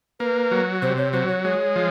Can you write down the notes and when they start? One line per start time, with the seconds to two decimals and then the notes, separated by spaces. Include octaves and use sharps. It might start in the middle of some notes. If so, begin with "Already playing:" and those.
0.20 A#3 B4
0.51 F#3
0.82 C3 C5
0.98 C#5
1.13 F#3 C5
1.28 C#5
1.44 G#3 C#5
1.76 F3